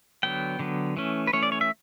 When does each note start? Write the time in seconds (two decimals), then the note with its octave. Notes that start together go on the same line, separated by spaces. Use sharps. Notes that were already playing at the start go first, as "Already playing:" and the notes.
0.23 D3 F#3 B3 G5
0.59 D3 F#3 B3
0.97 E3 A3 C#4
1.27 B4
1.33 E3 A3 C#4 C#5
1.43 D5
1.52 C#5
1.61 E5